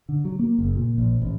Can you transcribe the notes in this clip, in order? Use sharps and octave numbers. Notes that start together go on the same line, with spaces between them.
D3
F#3
A#3
F#1
A#2
A#1
A1